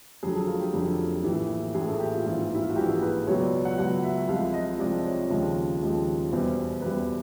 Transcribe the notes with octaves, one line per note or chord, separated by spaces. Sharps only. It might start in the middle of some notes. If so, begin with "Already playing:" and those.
F1 F2 D3 F#3 G#4
A4
F4
G4
F1 F2 D3 F#3
A#1 A2 E3
A#1 A2 E3 G#4
A4
G4
F4
A#1 G#2 E3 F4
E4
F4
F#4
A#1 G#2 E3 G4
G#4
B4
C#2 B2 F#3 C#5
D5
F#5
C#2 B2 F#3 F#5
E5
C2 C3 F3 G#3 F5
D#5
C2 C3 F3 G#3 D5
C#5
D#2 C#3 F3 G#3
D#2 C#3 F3 G#3
E2 B2 G3 C5
E2 B2 G3 B4